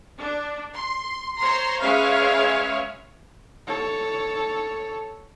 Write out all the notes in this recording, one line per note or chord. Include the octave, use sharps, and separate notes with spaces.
D4
C6
C5 C#5 A#5 C6
G#3 C#4 B4 C#5 E5 F5
A4 C#5